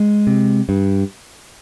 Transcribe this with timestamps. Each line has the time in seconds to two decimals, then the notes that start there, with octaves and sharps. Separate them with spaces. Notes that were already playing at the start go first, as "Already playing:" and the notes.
Already playing: G#3
0.27 C3
0.69 G2